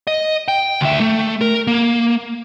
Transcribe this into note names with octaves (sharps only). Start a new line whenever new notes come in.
D#5
G5
D2 E5
A3
A#4
A#3